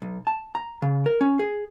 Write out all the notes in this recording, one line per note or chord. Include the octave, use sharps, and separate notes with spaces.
B1
A5
A#5
C#3
A#4
C#4
G#4